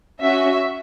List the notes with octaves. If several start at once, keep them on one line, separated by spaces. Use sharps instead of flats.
C#4 F#4 E5